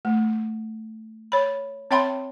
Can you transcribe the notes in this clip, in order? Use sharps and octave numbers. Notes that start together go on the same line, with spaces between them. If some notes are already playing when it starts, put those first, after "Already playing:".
A3
C#5 B5
C4 C#5 E5 G5 B5 C6